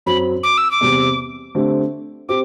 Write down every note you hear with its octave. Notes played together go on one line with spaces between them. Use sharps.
F#2 F#3 C4 B5
D6
E6
D6
E2 C3 G3 C4
D3 A3 C4 G4
C4 G4 D6